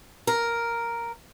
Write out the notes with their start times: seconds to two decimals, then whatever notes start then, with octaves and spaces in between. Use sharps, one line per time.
0.27 A#4